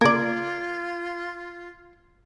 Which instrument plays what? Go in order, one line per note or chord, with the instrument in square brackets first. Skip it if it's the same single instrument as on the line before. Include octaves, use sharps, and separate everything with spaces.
[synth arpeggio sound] C#3 A#3 [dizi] F4 [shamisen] A#4 D5 [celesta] G#6 D7